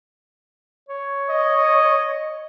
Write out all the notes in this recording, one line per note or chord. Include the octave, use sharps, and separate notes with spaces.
C#5
D#5